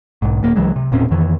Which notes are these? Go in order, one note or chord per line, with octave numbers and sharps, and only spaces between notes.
B1 G#2
D#1 A#3
C2 E3 F#3 G#3
C3
E1 A#2 C4 C#4
F2 D#3 E3